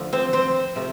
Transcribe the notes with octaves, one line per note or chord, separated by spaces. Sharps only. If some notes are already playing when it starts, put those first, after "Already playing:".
Already playing: D3 F3 A3
C4 C5
C4 C5
C3 F3 A3